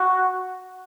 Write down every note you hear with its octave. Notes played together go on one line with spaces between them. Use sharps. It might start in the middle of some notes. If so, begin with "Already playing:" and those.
Already playing: F#4